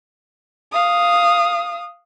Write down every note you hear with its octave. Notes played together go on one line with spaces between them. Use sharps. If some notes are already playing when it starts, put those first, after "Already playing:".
F5 D#6